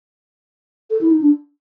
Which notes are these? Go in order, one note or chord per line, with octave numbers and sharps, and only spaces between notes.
A4
E4
D#4
D4